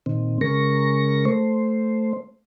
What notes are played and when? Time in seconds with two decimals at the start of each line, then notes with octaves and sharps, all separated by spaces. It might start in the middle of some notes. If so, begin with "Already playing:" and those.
0.06 A#2 D#3 C4
0.41 C#3 G#3 A#4 C#6 A#6
1.25 A3 C5